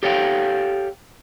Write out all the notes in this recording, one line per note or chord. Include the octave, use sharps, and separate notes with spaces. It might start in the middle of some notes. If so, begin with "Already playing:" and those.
G4 A4 C#5 F5 G5